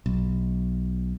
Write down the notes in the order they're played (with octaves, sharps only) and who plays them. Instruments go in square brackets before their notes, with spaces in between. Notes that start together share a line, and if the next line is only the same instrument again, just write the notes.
[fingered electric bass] B1